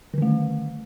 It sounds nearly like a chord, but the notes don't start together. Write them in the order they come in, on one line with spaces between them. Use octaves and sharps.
D3 D#3 A3